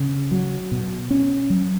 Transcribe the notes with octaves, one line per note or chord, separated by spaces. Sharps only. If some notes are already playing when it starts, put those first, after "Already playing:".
Already playing: C#3
F#3
B2
C#4
F#3